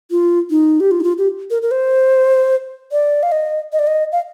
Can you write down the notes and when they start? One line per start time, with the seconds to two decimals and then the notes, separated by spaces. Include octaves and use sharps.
0.11 F4
0.50 D#4
0.80 G4
0.91 F4
1.00 D#4
1.03 F4
1.18 G4
1.50 A#4
1.62 A#4
1.71 C5
2.92 D5
3.23 F5
3.32 D#5
3.73 D#5
3.79 D5
3.87 D#5
4.12 F5